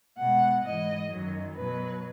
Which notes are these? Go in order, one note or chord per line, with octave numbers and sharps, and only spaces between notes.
B2 G#3 F#5
G#2 E3 G#3 D#5
F#2 D#3 F#3
B2 F#3 B4